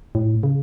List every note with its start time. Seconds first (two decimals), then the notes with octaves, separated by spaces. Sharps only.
0.15 A2
0.43 C#3